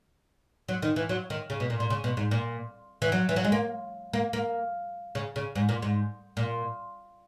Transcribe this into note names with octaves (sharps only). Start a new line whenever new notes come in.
F#3
D#3
E3
F#3
D#3
C#3
B2
A#2
A#2
C#3
B2
G#2
A#2
E3
F#3
E3
F#3
G#3
A#3
A#3
A#3
C#3
C#3
G#2
A#2
G#2
A#2